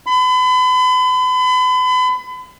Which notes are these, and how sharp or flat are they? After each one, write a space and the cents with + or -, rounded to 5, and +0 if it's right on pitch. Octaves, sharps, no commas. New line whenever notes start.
B5 +40